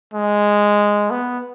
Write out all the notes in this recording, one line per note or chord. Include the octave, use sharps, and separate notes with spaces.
G#3
B3